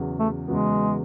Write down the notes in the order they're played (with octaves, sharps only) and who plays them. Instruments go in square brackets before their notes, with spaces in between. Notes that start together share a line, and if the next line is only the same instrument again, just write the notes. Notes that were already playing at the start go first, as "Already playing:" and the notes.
Already playing: [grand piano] E2 C#3 F#3 B3
[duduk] A3
[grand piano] E2 C#3 F#3 B3 [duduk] G#3